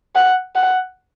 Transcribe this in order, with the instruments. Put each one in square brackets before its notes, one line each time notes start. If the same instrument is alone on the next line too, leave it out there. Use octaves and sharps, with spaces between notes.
[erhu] F#5
F#5